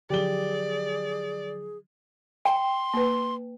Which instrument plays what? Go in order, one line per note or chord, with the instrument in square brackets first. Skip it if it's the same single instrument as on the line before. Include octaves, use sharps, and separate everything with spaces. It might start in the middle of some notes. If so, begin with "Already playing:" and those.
[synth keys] D3 F3 F#3 [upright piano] G4 G7 [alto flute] G#4 [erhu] D5
[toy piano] G5 [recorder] C6
[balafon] A#3 B4